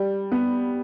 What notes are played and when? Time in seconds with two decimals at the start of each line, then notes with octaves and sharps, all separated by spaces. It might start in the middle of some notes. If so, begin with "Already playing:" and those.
Already playing: G3
0.32 B3